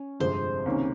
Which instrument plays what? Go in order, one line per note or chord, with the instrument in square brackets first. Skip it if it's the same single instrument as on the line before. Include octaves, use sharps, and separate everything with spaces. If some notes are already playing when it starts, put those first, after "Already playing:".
Already playing: [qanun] C#4
[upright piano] G1 F2 C3 F3 G#3 [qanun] C5
[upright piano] C#2 C3 D#3 A#3 C#4